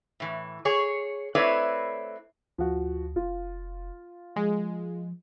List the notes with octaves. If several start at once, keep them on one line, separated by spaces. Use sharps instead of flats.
A2 E3
G#4 C#5
A3 C4 E4 B4 C#5 D5
D2 F3 F#4
F1 F4
F3 G#3